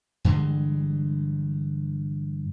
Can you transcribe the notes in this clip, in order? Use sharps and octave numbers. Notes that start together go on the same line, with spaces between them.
G2 D3 E3 G#3